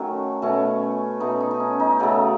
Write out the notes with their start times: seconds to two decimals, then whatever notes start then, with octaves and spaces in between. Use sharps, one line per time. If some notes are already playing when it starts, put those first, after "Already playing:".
Already playing: D#3 F#3 A3 C#4
0.42 B2 A3 C#4
1.20 B2 A3 C#4 D#4
1.40 D#4
1.51 D#4
1.60 C#4
1.80 D#4
2.00 C#3 F#3 A3